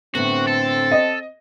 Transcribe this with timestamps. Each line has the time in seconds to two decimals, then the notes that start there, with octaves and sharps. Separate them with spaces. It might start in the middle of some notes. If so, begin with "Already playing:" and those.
0.15 A2 D3 B3 C4 F#4
0.47 A4
0.92 D#5